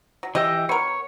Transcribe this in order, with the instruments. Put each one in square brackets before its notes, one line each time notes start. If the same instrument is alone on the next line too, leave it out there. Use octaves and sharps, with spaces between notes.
[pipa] F#3
[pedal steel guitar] E3 G4 E5 [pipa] D#5
[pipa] B3 A#4 [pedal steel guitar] C#5